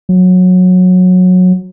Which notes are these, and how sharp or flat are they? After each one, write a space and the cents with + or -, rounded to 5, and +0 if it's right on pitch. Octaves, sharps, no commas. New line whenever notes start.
F#3 -20